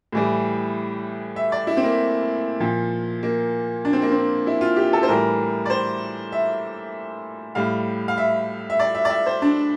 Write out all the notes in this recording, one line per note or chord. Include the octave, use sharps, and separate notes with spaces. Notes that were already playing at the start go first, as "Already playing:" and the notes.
A2 E3 G3
E5
D5
E4
C4
A#3
A#2 F3
A#3
D4
C4
A#3
C4
E4
F4
G4
A4
C5
A2 E3 G3 A#4
D5
C5
E5
A2 G3 F5
F5
E5
E5
D5
E5
D5
E5
C5
D4